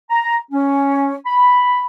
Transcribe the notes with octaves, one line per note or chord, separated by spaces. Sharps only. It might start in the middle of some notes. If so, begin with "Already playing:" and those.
A#5
C#4
B5